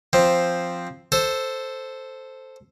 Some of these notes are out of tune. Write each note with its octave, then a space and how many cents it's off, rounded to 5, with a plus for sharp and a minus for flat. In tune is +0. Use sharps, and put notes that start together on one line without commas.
F3 +0 C4 +0
A4 +0 C5 +0